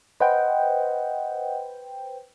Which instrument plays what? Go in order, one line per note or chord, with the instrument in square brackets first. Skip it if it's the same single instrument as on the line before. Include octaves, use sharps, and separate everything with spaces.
[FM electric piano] B4 C5 G5 [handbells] D#5 F#5